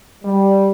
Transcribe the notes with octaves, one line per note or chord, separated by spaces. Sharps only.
G3